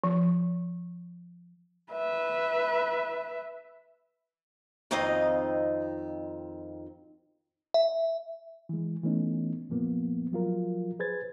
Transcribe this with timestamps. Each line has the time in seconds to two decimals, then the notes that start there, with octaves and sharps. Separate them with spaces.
0.04 F3
1.92 B4 E5
4.91 F2 D#3 C4 D#4 F4 D#5
7.74 E5
8.69 E3 G#3
9.04 E3 A3 B3 C#4 D#4
9.69 F#2 A#2 F3 A#3 B3
10.32 F3 F#3 F4 A#4
10.99 G#4 B4 C5 G#6 A6